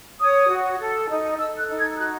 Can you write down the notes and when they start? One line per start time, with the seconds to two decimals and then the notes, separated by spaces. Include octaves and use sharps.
0.20 C#5 D#6
0.49 F#4
0.79 A4
1.09 D#4
1.38 A4 E6
1.58 F#6
1.69 D#4
1.78 G#6
1.97 F#4 F#6